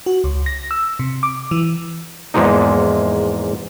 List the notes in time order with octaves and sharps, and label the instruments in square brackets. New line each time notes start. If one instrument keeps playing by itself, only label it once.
[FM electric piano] F#4
C#2
A#6
E6
C3
D6
E3
[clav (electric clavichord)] E2 G#2 F3 G#3 A#3 D#4